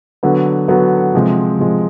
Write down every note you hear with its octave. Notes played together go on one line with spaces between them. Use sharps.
D3 F#3 B3
D3 F#3 B3
C3 F3 G#3
C3 F3 G#3